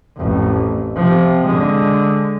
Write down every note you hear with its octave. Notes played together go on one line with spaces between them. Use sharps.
A1 F2
C3 F3
D3 G#3